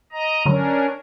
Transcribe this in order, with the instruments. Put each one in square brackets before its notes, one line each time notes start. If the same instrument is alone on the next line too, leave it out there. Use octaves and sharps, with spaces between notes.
[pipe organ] D#5 A#5
[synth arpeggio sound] D3 F#3 [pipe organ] C#4 D4 A#4